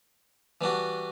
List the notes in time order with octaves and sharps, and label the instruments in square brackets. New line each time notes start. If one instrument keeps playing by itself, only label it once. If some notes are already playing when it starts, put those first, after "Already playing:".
[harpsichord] E3 G3 D4 F#4